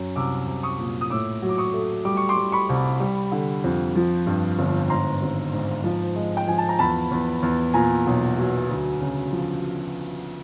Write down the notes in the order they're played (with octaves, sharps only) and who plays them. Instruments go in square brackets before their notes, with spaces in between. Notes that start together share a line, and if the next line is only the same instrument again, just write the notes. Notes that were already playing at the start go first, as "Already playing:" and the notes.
Already playing: [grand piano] F#2
C2 D6 E6
C2
C#6 D#6
A#2
D#6
A2 D6 E6
F#3
D6
C#6 D#6
A3
G3 D6
C#6
C6 D6
G3
B5 C#6
C2
G3
D3
F2
F3
G2
G1
G#2 A#5 C6
G#1
G#2
F3
G#3
G5
F3 G#5
A5
A#5
E2 A5 B5
E2
E2
A#2 G#5 A#5
B1
F#3
D2
C#3
F3